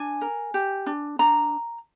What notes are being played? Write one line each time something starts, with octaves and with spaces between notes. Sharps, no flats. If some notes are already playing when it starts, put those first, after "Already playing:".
Already playing: D4 G#5
A#4
G4
D4
D4 A#5